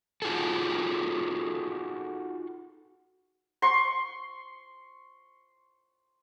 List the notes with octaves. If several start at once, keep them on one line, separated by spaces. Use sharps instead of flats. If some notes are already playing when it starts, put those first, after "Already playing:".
D#4 F4 F#4 G#4 A4
C6 C#6